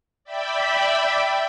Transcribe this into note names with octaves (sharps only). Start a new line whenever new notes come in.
D5 E5 G5 B5